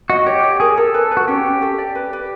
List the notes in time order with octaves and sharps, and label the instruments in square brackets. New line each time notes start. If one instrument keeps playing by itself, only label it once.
[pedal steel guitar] F#4 [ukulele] D#5
[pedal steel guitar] G4 [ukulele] C#5
[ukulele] C#5
[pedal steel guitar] G#4 [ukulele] A#4
[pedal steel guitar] A4 [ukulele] A#4
[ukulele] B4
B4
[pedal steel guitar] F#4
[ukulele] C#4 [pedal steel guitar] G4
[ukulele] C#4
A4
D5
B4
B4